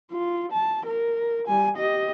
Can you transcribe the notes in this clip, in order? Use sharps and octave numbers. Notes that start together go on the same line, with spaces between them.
F4
A5
A#4
G3 G#5
G4 D#5